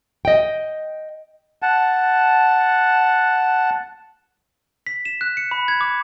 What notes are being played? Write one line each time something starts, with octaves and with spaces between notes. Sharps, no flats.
D#5 G5
F#5 A5
B6
E7
F#6
C#7
B5
G#6
D6